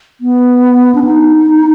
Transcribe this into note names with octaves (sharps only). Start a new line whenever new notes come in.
B3
D4
D#4